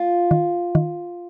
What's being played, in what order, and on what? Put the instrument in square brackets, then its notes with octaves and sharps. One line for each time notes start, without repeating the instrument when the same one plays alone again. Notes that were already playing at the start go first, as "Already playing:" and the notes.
Already playing: [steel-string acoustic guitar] F4
[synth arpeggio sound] D#3
D#3